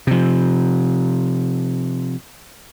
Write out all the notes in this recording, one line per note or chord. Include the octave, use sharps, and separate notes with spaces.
C3 F3